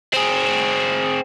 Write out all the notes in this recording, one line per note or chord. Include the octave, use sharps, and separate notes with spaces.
C4 G#4